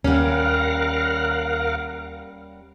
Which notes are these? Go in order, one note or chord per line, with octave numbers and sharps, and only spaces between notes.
D#2 G3 A#3 C#4 A#4 F5 F#5